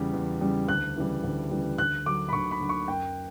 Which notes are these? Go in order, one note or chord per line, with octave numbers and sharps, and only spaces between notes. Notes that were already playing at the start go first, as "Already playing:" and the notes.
Already playing: E2 C#3 G3
E2
C#3 G3
D2 F#6
C#3 E3 G3
D2
C#3 E3 G3
D2 F#6
D3 F#3 D6
B5
D2 C#6
B5
D3 F#3
C#6
F#2 G5